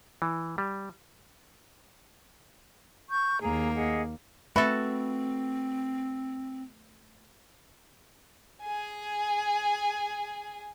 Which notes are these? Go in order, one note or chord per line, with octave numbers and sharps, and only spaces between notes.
E3
G3
C#6 G6
D#2 A#3 G#4 A#5
G#4 D#5 F#5
A3 C4 F#4 A4 B4 E5 B5
G#4 G#5